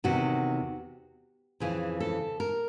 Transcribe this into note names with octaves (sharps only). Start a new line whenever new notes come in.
E2 C3 D#3 F#4
F2 C#3 E3 G#4
A4
A#4